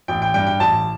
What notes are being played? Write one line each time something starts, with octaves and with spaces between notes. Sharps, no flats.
A1 G5
G5
G2 G5
G5
A1 A5